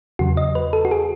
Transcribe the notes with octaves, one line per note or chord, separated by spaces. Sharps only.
E2 C#3 F#3 F#4
D#5
B4
A4
F#4
G#4